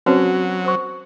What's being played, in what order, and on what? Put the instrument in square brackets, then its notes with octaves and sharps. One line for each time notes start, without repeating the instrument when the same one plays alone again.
[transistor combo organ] F#3 [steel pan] C4 C#4 A5 [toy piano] F#4 B4 C5
[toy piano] A#4 C5 C#6